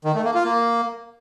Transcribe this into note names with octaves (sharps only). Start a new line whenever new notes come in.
D#3
A3
A#3
F4
A#3